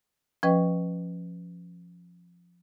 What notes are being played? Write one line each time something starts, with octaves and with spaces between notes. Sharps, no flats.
F3 C#4 B4 D#5 G5